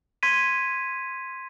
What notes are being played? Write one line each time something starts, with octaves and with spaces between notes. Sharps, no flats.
C6 G#6 B6 D#7